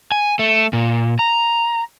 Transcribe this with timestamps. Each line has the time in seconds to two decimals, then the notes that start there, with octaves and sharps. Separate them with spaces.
0.12 G#5
0.39 A3
0.73 A#2
1.19 A#5